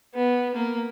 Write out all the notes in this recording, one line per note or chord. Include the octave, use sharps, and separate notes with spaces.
B3
A#3